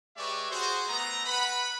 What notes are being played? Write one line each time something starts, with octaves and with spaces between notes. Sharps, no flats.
G#3 G4 B4 C#5 D5 E5
F#4 G#4 C5
A3 B3 A#5
B4 F#5 B5